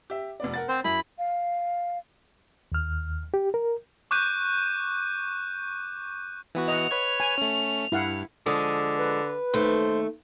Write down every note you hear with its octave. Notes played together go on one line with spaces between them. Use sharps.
G4 E5
F1 B3 D5
A#4 F#5 A6
C4 C5
F#2 E4 B5
F5
D#2 F6
G4
A#4
C#6 D6 F#6 G6 D#7
E3 B3 F#4
D#5 F#5 F7
B4 C#5 G#6
G#5
A3 C#4
G2 E4 F5 F#5
D3 F3 G#3 D#6
B4
D#2 A3 C5